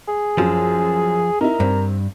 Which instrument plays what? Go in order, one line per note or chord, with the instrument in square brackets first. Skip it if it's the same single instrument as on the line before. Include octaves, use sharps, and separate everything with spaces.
[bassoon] G#4
[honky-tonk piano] F#2 [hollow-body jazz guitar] F3
[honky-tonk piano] D#4 E4 [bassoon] A#4
[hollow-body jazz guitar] G2 [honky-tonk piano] C4